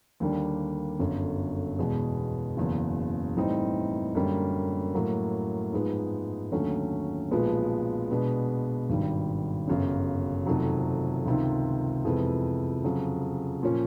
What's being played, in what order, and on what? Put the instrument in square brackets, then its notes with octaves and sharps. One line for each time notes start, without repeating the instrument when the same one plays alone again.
[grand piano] D#2 D3 G3 A#3 D4
G1 F#2 D3
E2 B2 G#3
F#1 E2 C#3
A2 E3 G3 C4 D#4
F#2 D3 G3 A#3
A2 F#3 A#3
G#2 F3 G#3 B3
D#2 D3 F#3 A3 C#4
B1 A#2 F3 G#3 B3
B2 G#3 B3 D4
G#1 G2 D#3 G3
G1 F#2 C#3
F1 F2 C3 D#3 F#3
C#2 C3 D#3
F2 C3 E3 G#3 B3
F2 C#3 F#3
A#2 F3 A#3 C#4